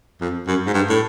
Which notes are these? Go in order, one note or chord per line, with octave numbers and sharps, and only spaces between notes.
F2
F#2
G#2
G2
A2